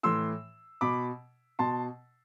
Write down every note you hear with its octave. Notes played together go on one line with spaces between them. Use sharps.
A2 E3 C6 E6
B2 B5 D6
B2 A5 C6